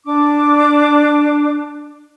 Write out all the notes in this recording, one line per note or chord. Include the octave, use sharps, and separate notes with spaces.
D4 D6